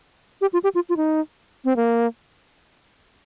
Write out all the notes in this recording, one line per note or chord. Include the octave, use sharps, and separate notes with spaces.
G4
F4
G4
F4
F4
D#4
C4
A#3